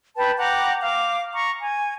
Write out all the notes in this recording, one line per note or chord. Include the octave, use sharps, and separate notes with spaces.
B4 G5 A5
F#5 G5 A#5 D6
F5 D6
A#5 C#6
G#5